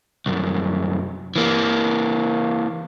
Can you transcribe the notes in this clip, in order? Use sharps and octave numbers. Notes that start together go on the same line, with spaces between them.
C2 F#2
E3 A#3